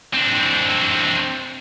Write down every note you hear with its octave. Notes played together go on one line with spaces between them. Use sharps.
C4 D4